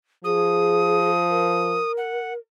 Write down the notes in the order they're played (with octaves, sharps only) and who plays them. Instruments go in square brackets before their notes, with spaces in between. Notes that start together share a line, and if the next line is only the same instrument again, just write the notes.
[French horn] F3 [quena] G#4 [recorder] D#6
[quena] A#4
[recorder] F#5